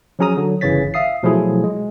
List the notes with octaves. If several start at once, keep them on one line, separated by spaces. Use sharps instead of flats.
F3 F#3 C#4 G#4 A#5 D#6
D3 F#3
G1 C#3 E3 C#5 A6 B6
E5 F5 D#6 C7
B2 F3 F#3 A3 E4 G#4
G#3